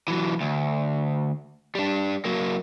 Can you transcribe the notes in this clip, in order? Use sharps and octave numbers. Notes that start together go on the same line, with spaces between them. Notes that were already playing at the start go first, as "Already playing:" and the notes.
E3 F#3
D2
G3 D4
F#3 A#3